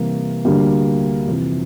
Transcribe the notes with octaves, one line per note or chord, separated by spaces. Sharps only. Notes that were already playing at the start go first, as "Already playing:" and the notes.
Already playing: C3 E3 G3 A#3
D2 D3 G3 A#3
F2 C3 E3